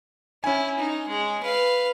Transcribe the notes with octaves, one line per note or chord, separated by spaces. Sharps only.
C#4 E4 G#5
D#4
G#3
B4 F5